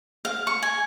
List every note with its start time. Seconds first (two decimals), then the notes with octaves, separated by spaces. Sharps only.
0.25 F5
0.47 C#6
0.62 G#5